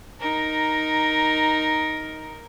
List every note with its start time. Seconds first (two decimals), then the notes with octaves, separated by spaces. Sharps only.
0.20 D#4 A#4